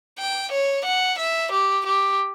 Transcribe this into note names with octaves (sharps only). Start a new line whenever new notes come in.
G5
C#5
F#5
E5
G4
G4